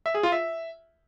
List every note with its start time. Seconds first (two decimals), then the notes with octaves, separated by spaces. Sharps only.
0.06 E5
0.14 G#4
0.23 F4
0.32 E5